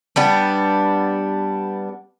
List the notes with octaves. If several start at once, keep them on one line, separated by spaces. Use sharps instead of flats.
G3 B3 D4